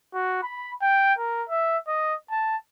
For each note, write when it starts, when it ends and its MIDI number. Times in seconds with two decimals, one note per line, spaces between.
0.14 0.40 66
0.43 0.72 83
0.82 1.13 79
1.19 1.43 70
1.49 1.78 76
1.87 2.15 75
2.31 2.57 81